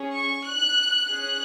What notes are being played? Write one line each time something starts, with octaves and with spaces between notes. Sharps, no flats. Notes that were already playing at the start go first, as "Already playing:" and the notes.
Already playing: C#4 G#4
C#6
F#6
C#4 G#4 F#6